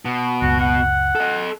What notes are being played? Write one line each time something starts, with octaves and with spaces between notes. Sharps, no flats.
B2
F#1 C#2 F#4
F#5
A4 D#5